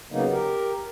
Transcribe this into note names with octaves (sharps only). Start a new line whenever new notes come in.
C#3 F#3 A#3 B3 D#4
G4 A#4